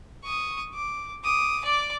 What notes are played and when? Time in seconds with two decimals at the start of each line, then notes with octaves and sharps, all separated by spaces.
0.24 C#6 D#6
0.74 D6
1.24 D6 D#6
1.65 D5 D6